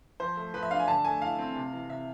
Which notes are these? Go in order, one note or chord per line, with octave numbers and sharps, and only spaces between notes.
F3 C5
A3
F3 B4
E5
D4 F5
G#5
D3 A5
A3 G#5
E4 F5
C4
C3
E3
C3 E5